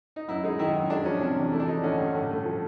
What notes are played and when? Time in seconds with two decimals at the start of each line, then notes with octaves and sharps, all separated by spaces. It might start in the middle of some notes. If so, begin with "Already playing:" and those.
0.16 D#4
0.28 F#2 E4
0.44 G#3 D#4
0.59 D#3 E4
0.75 F#2
0.90 G#3 D4
1.05 F3 C#4
1.21 C3 D4
1.38 E2
1.52 A3 E4
1.60 D4
1.68 F3 D#4
1.84 D3 C#4
1.99 G2
2.14 A2
2.30 A3
2.45 F3